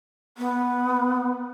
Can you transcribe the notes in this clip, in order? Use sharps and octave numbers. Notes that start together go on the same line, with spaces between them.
B3